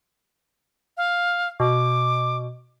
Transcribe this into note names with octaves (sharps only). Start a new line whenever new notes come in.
F5
B2 D6